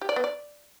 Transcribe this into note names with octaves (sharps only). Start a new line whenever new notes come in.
G4
D5
B3
D5